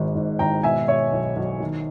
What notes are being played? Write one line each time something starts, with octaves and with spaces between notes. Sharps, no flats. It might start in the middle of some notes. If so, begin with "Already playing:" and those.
Already playing: G#1 G#2 D#3
G#2
G#1 G5 A#5
B2 E5 G#5
B2 C#5 E5
B1
B1
D#3